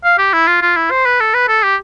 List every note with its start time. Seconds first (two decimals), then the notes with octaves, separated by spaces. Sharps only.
0.04 F5
0.18 G4
0.33 E4
0.47 F4
0.62 F4
0.76 E4
0.91 C5
1.06 B4
1.20 A4
1.34 B4
1.48 A4
1.63 G4